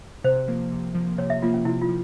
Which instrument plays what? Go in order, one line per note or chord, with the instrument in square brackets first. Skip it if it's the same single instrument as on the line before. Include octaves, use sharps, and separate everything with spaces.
[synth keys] C3 [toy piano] C5
[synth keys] F3 A#3
C3
F3 A#3
[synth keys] C3 [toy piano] C#5
[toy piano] E5
[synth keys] F3 A#3 [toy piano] F4
[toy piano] C#4
[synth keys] C3 [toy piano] E4
[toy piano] F4
[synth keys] F3